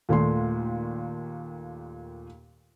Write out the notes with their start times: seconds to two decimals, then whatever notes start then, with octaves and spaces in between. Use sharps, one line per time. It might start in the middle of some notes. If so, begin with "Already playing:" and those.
0.09 D#2 A#2 A3 C6